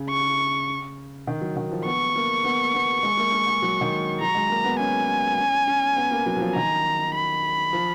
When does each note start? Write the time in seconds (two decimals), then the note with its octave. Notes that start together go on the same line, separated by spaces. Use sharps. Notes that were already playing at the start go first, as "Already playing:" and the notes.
Already playing: C#3
0.10 C#6
1.27 D#3
1.41 F#3
1.57 D#3
1.71 F3
1.85 B3 C#6
2.16 A#3
2.44 B3
2.74 B3
3.03 G#3
3.17 A#3
3.32 A#3
3.47 G#3
3.62 F#3
3.81 D#3
4.21 F#3 A#5
4.35 G#3
4.50 A#3
4.64 B3
4.79 C#4 G#5
5.39 C#4
5.67 C#4
5.97 B3
6.11 A#3
6.26 F#3
6.36 F#3
6.40 F3
6.55 D#3 A#5
7.14 B5
7.73 F3